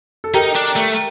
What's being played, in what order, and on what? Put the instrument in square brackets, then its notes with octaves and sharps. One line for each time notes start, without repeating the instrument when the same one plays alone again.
[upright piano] A4
[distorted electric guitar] D#4 [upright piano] G4 A#4
[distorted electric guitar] D4
A3